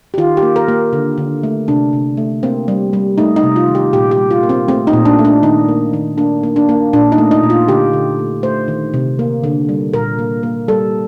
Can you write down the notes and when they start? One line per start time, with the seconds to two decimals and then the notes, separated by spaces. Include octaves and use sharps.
0.14 G4
0.18 D#3 F4
0.37 G4
0.42 A#3
0.56 A#4
0.68 A#3
0.93 D3
1.18 D3
1.43 A3
1.68 C3 D4
1.93 C3
2.17 A3
2.43 A#3 C4
2.68 G3
2.93 G3
3.18 A3 D#4
3.36 D#4
3.43 C3
3.56 F4
3.68 D#3
3.75 G4
3.93 A#2 G4
4.11 G4
4.18 G3
4.31 F4
4.43 A#3
4.49 C4
4.68 A3 C4
4.87 D#4
4.93 A#2
5.05 D4
5.19 A3
5.25 D4
5.43 D#3 D#4
5.69 A#3
5.93 D#3
6.18 A#3 D4
6.43 A#3
6.56 D4
6.69 A#3
6.93 A#2 D4
7.12 D#4
7.18 A3
7.31 D#4
7.43 A#2
7.50 F4
7.68 D3 G4
7.93 D3
8.19 A3
8.43 A3 C5
8.68 D#3
8.94 C3
9.19 A#3
9.44 D3
9.69 G3
9.94 A#2 A#4
10.19 A#3
10.43 A#3
10.68 G3 A4